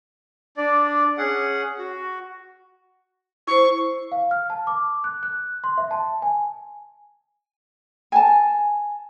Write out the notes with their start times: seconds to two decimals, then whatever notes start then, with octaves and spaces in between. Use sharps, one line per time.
0.57 D4 D5
1.18 C#4 G#4 F#5
1.79 F#4
3.47 E4 C5 C#6
4.12 F5
4.31 F6
4.50 A5
4.67 D6
5.04 F#6
5.23 F#6
5.64 C6
5.78 E5
5.91 A5
6.22 G#5
8.12 G#5 A5